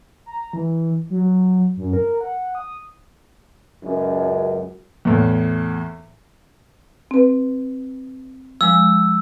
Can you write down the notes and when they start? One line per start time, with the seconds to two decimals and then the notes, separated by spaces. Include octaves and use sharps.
0.26 A#5
0.53 E3
1.10 F#3
1.77 F#2
1.93 A#4
2.21 F#5
2.55 D#6
3.84 C#2 F#2
5.05 E2 A2
7.11 C4 B4
8.61 F3 G#3 E6